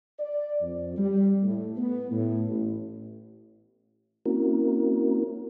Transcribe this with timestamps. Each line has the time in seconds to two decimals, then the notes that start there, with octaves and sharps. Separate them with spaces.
0.19 D5
0.61 F2
0.97 G3
1.42 A2
1.76 B3
2.11 A2
2.49 A1
4.26 A#3 C4 C#4 E4 F#4 A#4